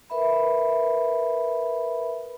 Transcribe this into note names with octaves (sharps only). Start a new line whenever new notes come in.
A#4 B4 E5 B5